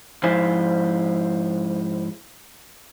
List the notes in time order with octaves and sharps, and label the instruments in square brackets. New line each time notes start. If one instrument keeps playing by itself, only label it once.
[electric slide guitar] G#2 F3 E4 C5 G#5